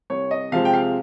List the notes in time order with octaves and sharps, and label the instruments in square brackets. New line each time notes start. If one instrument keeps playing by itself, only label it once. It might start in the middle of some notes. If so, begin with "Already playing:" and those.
[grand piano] C2 C#5
D#5
C3 F3 G#3 C4 F5
G5
F5